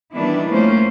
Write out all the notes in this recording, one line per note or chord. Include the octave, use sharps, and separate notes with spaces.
D#3 E3 G3 B3 D4 E4
F2 F3 A3 A#3 C#4 C5